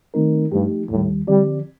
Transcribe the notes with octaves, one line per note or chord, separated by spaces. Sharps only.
D#3 A3 C4 D#4 A#4
G2 F3 A3 D#4 G4
D#2 A2 D#3 G3
D3 F3 G3 C4 G4 D5